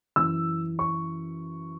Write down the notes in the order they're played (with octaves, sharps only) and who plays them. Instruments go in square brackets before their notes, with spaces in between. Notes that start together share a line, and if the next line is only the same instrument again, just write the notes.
[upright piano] F#2 E3 E6
C#6